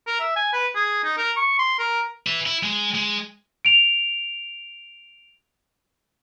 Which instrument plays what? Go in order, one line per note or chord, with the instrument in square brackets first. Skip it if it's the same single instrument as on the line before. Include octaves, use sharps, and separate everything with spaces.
[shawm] A#4
E5
G#5
B4
G#4
D#4
A#4
C#6
C6
A#4
[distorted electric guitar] B4 E5
E4
G#3
G#3
[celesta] D7 F7